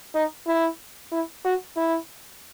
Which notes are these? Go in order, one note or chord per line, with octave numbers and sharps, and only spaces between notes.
D#4
E4
E4
F#4
E4